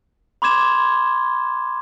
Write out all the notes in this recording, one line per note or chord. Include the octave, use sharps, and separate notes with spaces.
B5 C6 D6 G#6 E7